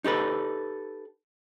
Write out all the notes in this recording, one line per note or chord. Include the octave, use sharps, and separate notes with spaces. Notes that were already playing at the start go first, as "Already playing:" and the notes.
D#4 G4 A4 B4